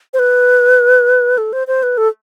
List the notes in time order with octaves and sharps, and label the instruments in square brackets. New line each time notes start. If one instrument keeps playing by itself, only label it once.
[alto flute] C5
B4
A4
C5
C5
B4
A4